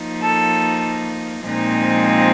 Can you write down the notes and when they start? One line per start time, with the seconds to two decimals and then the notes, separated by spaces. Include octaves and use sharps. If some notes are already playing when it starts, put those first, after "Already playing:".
Already playing: F3 A#3 D#4
0.22 A4
1.42 A#2 F3 G#3 C4 D#4